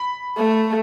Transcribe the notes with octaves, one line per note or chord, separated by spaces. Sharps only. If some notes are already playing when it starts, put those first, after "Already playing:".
Already playing: B5
A3